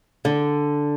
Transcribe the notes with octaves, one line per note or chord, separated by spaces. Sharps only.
D3